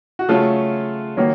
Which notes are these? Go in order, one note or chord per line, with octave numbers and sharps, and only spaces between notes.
F#4
C#3 F#3 A3 C#4 F4 A4
D#3 F#3 A#3 C#4